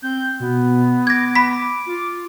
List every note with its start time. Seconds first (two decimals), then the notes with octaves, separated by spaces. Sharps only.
0.02 C4 G6
0.40 B2 B3
1.07 D6 G#6 A#6
1.35 B5 B6
1.87 F4